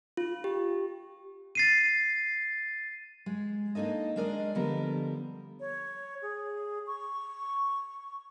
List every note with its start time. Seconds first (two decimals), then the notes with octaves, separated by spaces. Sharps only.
0.17 F4
0.44 G4
1.55 A6 C7 D#7
3.26 G#3
3.75 A#3 D4 D#4 A4 D#5
4.16 G#3 D4 A#4 D5 D#5
4.55 D3 F3 G3 B3 A4 A#4
5.60 C#5
6.22 G#4
6.87 C#6